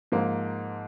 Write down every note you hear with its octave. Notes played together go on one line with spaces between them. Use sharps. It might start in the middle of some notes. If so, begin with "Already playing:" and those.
G#2 F3 A#3